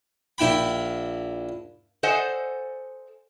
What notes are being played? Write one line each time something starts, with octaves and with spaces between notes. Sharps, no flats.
A#1 E4 G5 B5
A4 C5 D5 D#5 F#5 G#5